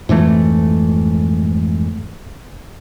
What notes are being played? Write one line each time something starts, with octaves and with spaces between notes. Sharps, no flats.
F2 G#2 E3 A3